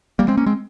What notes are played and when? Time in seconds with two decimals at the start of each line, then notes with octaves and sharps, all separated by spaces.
0.19 G3 A#3
0.28 G#3 C4
0.37 A#3 C#4
0.46 G#3 C4